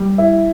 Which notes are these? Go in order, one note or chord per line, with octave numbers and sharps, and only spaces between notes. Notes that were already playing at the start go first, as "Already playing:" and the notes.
Already playing: G3
E4